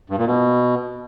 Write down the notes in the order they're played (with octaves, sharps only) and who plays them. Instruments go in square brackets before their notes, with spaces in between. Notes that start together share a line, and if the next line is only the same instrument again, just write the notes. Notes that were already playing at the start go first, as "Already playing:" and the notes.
[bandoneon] G2
A#2
B2